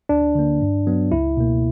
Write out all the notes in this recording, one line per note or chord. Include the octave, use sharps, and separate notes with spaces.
D2 D4
D3 A#3
G2
F#3 B3
C#2 E4
B2 A#3